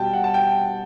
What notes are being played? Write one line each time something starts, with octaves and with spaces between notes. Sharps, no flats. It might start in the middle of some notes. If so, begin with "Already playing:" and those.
Already playing: B2 G3 G5 A5
F#5
A5
G5